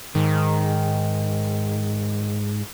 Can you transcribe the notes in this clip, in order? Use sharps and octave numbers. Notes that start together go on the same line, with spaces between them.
G#2 D#3